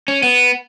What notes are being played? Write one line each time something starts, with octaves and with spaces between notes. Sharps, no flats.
C#4
B3